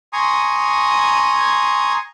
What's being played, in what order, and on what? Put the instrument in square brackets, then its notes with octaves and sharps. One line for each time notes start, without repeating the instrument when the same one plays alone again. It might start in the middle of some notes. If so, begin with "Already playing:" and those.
[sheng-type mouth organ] G#5 A#5 C6 C#6 D#6